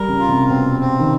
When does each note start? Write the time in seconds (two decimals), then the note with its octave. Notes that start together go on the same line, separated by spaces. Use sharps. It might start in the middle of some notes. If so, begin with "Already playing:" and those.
Already playing: G3 A#4
0.08 C#3
0.19 F4
0.29 C3
0.49 B2 C4
0.80 C4
0.99 D#3